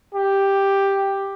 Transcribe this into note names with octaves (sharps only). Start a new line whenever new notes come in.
G4